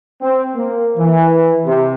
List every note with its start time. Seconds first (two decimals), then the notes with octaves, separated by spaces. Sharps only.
0.21 C4
0.56 A#3
0.97 E3
1.65 C3